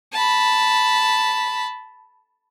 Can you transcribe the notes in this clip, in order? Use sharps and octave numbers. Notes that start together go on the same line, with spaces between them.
A5 B5